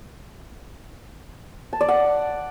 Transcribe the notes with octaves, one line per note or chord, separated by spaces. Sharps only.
A5
D5
F#5